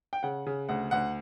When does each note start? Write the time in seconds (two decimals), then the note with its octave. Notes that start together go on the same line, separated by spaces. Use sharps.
0.13 G5
0.23 C#3 F#5
0.46 C#3
0.69 D2 F#5
0.91 D2 F#5